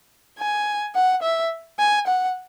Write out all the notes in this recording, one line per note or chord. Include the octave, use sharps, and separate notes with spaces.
G#5
F#5
E5
G#5
F#5